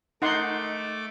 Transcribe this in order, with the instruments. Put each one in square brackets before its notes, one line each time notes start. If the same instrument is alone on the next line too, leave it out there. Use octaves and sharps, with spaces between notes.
[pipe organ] A3 D6 [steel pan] D#4 F#5 C6